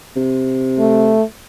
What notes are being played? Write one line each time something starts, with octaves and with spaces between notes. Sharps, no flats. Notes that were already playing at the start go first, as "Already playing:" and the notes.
C3
A3